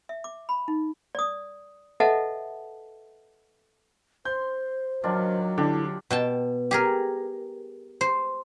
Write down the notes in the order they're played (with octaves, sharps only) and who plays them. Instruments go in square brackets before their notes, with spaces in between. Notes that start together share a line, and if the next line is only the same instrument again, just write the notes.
[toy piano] E5
D6
B5
D#4
D5 D#6
A4 B4 D#5 E5 F#5 A5
[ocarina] C5 [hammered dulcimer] C6 [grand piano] G6
[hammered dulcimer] D#3 D4 F4 [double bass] F#3
[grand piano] D3 [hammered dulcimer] D4 G4 [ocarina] E4
[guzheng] B2 G5 A5
G4 G#4 A#4
C5